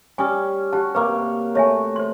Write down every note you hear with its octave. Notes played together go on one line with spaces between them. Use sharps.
G3 C#4 G#5 C#6 D#6
F#4 G4 A5
C3 A#3 B4 C#5 D6
A3 C#5 E5 G#5
C5 C6